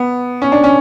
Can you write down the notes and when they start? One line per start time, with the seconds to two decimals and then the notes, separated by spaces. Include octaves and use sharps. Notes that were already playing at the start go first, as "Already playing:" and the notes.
Already playing: B3
0.42 C#4
0.52 D4
0.64 C#4